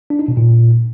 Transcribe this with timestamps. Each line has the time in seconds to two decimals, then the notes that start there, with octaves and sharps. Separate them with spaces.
0.10 D4
0.19 D#4
0.28 B2
0.37 A#2